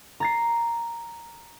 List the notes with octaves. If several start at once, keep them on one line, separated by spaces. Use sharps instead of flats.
A#5 A6 C7